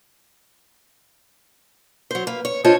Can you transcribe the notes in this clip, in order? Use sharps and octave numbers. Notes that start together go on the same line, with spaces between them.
F#3 C5
A#3 B4
C#5
D4 F4 C5 C#5 D#5 A5